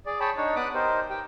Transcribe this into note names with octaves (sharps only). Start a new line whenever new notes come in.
G#4 D5
G#4 C#5 G5 A5 B5
D4 D#4 C#5
B3 D5 B5 D6 D#6 F#6
D#4 G4 A#4 C5
G4 G5